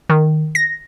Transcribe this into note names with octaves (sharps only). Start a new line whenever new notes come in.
D#3
A#6